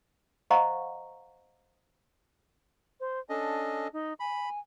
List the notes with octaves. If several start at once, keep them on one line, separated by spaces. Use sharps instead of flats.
C5 D#5 F5 F#5 A#5 C#6
C5
C#4 D4 A4 D#5
D#4
G#5 B5